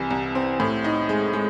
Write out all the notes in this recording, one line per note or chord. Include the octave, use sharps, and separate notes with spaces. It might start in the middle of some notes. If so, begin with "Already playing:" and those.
Already playing: C2 E3
C2
C4
A2
D#4
G#3
G#3